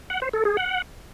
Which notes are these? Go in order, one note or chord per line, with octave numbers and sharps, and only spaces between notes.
F#5
C5
A4
G#4
F#5